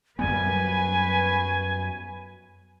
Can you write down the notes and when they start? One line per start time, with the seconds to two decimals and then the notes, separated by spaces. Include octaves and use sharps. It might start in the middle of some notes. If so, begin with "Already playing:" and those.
0.19 F#2 F#3 G3 B3 B4 G#5